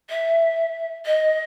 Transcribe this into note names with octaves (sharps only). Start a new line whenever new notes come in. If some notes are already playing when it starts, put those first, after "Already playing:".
E5
D#5